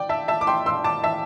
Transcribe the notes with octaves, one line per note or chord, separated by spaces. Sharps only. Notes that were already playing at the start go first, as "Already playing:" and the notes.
Already playing: D5 G5
E5 A5
E5 A5
D6
G5 C6
C6 E6
A5 D6
E5 A5